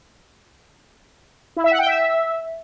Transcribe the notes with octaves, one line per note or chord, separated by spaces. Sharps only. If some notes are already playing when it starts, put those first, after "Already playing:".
E4
E5
F#5
G5
E5